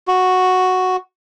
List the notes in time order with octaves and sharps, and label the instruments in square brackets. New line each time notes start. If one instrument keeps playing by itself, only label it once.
[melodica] F#4